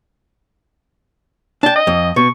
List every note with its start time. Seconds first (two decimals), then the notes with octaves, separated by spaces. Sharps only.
1.63 D4 G5 A5
1.76 D#5
1.87 F2
2.16 B2 C#6